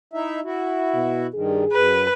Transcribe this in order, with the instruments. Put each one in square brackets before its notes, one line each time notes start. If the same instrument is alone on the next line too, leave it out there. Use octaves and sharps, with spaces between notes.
[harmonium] D#4 E4 E5
E4 F#4
[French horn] B2
[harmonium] G2 D#3 [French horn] G#4
[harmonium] F#2 [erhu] B4